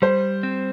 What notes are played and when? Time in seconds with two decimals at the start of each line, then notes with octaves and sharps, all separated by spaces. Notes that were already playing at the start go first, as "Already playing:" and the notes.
0.02 G3 C5
0.43 C4